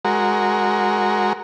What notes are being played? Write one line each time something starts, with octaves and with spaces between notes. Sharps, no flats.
G#3 F#4 A#4